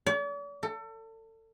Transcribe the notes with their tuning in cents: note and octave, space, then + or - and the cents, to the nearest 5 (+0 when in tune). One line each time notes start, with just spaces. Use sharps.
D5 -45
A4 +30